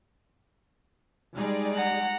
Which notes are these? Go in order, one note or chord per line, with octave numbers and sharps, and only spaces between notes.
G3 G#3 D#4 G#4 D5
F#5 A#5